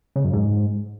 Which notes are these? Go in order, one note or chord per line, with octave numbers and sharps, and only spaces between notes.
C#3
F#2
G#2